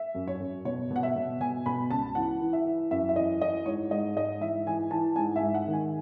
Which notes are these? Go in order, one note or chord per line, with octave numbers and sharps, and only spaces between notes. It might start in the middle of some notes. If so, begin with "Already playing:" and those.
Already playing: E5
F#2
C#5
F#2
B2 C#5
B2
F#5
E5
B2
B2 G#5
B2 B5
C#2 A5
E3 F#5
E3
E5
E3
F#2 E5
E5
E3 D#5
E3 D#5
G#2 C#5
G#2 D#5
G#2 D#5
E3 E5
E3 G#5
E3 A5
G#2 G#5
E5
G#2
F#5
D#3
G#5